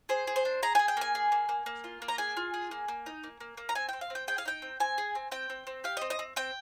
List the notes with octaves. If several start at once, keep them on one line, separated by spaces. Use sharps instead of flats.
G#4 C5
G#4
C5
D4
G#4 A#5
G#4 G#5
G5
A#3 G#5
G#4
A#3
A#3
A#3
F4
A#3
A#5
G#4 G#5
F4
G#4
A#3
A#3
D#4
A#3
A#3
A#3
A#5
C4 G#5
C4 G5
F5
C4
G5
G#4 G5
F5
D#4 G5
C4
C4 G#5
G#4
C4
C4 G5
C4
C4
G4 F5
D#5
C4
D#5
C4
C4 G5